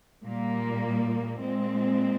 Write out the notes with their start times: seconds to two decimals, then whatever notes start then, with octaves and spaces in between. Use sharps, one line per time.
0.23 A#2 G3 A#3
1.38 A#2 G#3 C4